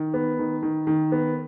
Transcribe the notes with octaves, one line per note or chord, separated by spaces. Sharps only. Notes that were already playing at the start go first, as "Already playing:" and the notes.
Already playing: D#3
B3
D#3
D#3
D#3
B3